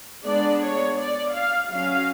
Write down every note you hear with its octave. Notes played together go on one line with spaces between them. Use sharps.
G#3 B3 D4 D5
C#5
D5
F5
F#3 C#4 F5